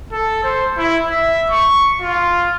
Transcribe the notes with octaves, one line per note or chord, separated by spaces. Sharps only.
A4
C5
E4
E5
C#6
F4